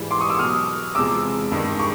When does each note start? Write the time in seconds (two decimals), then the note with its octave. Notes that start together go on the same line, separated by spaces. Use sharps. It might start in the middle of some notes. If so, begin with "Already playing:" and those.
Already playing: G#2 E3 G3
0.11 C6 D6
0.20 C#6 D#6
0.30 D6 E6
0.39 B2 F#3 D#6 F6
0.95 E2 C3 F3 G#3 D6 E6
1.52 G2 D#3 G#3
1.80 C#6